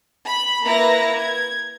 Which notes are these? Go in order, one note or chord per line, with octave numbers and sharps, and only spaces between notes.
B5
A#3 E4 B4 A#5 A#6
G#6